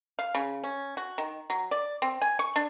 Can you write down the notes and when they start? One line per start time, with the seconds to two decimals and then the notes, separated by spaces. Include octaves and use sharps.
0.19 F5
0.35 C#3
0.64 C#4
0.97 F#4
1.18 D#3
1.50 F#3
1.71 D5
2.02 C4
2.22 G#5
2.39 C#6
2.56 D4